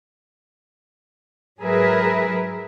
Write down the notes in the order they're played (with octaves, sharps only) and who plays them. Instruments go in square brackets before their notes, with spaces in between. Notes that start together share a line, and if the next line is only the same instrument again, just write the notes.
[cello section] G#2 F#3 G#4 A#4 B4 E5